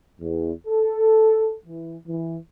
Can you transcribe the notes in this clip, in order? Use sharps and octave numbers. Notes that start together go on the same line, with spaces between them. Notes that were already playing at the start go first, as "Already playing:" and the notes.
E2
A4
E3
E3